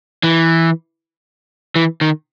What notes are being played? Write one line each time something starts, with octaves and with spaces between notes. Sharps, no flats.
E3
E3
D#3